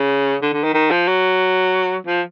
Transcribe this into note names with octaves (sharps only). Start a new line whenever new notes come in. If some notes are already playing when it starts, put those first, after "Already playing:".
Already playing: C#3
D3
D3
D#3
D#3
F3
F#3
F3